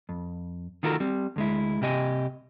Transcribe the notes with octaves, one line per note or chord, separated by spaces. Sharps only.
F2
D#3 D#4 F4 F#4 A4 A#4
G3 C4
D2 G#3 E4
C2 C3 G4 D#5 G#5